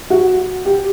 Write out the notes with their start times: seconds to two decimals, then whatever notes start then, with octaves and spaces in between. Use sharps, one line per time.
0.10 F#4
0.65 G4